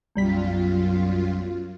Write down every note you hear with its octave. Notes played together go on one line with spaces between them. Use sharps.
B1 F#2 G3 F4 B6